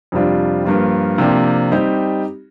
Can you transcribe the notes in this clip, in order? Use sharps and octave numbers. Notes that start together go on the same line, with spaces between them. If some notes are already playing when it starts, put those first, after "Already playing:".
F2 C3 G3 D4 F4
G2 F3 A#3 F4
C3 F3 A#3 D4 G4
G3 C4 D#4 G4